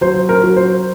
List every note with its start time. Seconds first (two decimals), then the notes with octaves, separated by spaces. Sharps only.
0.01 F#3 C5
0.29 A#4
0.43 F#3
0.57 C5